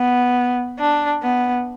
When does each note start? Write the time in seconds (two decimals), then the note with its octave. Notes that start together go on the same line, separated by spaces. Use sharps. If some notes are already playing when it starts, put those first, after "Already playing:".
Already playing: B3
0.79 D4
1.23 B3